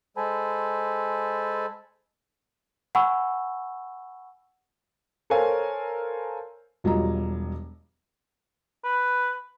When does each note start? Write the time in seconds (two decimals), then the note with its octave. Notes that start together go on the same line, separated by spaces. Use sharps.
0.17 G#3 A4 C5 G#5 A5 B5
2.95 F#5 G#5 B5 C#6 E6
5.30 A4 A#4 C5 C#5 F5 G#5
6.84 E1 F#3 G3 F4 D#5 A#5
8.84 B4